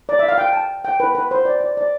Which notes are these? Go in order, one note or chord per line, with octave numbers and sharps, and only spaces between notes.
D5
E5
F5
G5
A5
G5
B4
B4
C5
D5
D5
D5